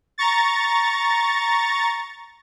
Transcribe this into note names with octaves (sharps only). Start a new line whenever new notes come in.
A#5 C#6 A6